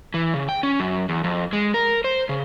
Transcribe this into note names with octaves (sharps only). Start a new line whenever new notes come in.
E3
C#3
G5
C#4
F#2
E2
F2
G#3
A#4
C5
C#3